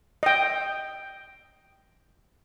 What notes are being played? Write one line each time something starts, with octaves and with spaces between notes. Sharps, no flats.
D#5 G5